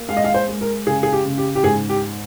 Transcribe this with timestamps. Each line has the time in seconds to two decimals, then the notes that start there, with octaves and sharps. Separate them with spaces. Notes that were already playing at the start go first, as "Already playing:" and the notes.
Already playing: A#3
0.08 G#3 F5
0.17 D#5
0.24 F5
0.34 C5
0.48 G#3
0.61 A#4
0.87 C#3 G#4
1.03 G#4
1.13 G4
1.25 C#3
1.38 G4
1.55 G4
1.63 G#2 G#4
1.89 G4